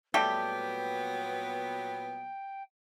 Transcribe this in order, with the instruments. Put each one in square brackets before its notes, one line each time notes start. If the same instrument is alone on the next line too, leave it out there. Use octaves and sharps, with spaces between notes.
[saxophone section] A#2 F#3 B3 [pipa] G3 A3 G4 [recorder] G5